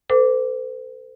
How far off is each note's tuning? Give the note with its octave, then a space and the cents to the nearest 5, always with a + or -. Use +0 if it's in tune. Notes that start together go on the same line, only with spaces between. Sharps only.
A4 +25 C5 -45 D6 -10